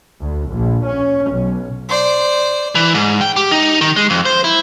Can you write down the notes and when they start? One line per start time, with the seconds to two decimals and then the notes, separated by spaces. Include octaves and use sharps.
0.21 D2
0.50 A#1
0.86 C#4
1.32 B1
1.89 C5 D5
2.75 E3
2.94 G#2
3.21 G5
3.36 G4
3.51 D#4
3.81 D#3
3.96 G#3
4.10 F2
4.26 C5
4.44 E4